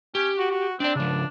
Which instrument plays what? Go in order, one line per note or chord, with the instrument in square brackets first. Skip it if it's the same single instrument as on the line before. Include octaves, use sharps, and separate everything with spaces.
[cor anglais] C#4 [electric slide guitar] G4
[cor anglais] F#4
F#4
[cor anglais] C4 [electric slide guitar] D4 D5
[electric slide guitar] C#3 F3 [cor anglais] D4